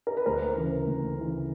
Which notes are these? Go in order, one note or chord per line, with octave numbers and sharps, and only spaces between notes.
A#4
B4
D2 A#4 C5
C#3 E3
D2
C#3 E3